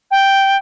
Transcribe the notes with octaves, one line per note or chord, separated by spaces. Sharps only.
G5